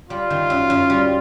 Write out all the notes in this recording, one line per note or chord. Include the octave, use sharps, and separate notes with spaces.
G3 F4
D#3
F#2
F#2
G3